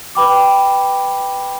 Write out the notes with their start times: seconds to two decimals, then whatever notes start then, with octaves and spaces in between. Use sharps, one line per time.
0.15 B4 G5 B5 D6